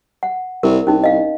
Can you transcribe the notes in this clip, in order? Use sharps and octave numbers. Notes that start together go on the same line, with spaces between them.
F#5
C2 A#4
C2 C#4 D#4
D#5 F5